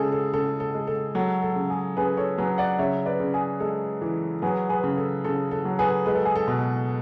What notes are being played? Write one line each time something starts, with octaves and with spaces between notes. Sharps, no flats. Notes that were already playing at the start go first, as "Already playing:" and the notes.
Already playing: C#3 G#3 G#4 A4
A4
C#3 A4
A4
G#3
A4
F#3 A4
A4
C#3
G#4
C#3 G#4 B4
A4 C#5
F#3 G#4 B4
D5 F#5
C#3 C#5 E5
B4 D5
C#3
G#4
G#3 A4
E3
F#3 G#4 B4
G#4 B4
C#3
A4
C#3 A4
A4
F#3
G#4 B4
G#3 B4
A4
G#4
A4
B2